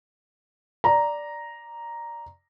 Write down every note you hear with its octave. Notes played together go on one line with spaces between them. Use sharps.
D5 A#5